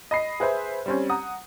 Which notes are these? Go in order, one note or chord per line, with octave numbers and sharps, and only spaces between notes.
D#5 B5 C7
G#4 B4 C5 E5
G3 C4 C#4
F#5 A#5 D#6